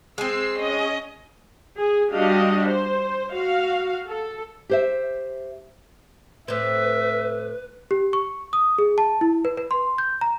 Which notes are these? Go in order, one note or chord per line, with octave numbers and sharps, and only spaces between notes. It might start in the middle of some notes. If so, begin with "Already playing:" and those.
G#3 C4 E6 C7
C#4 D#5
G#4
G3 D4 F#4 G4 D#5 F5
C5
F#4 F5
A4
G4 C5 E5
A2 C4 B4 E5
G4
C#6
D#6
G#4
A5
E4
B4
B4
C6
G6
A#5